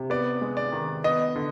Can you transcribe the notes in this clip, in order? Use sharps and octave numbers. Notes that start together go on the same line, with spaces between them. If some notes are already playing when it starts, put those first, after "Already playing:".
Already playing: C3
B3 D5
G#3
D5
D#3
B3 D#5
D3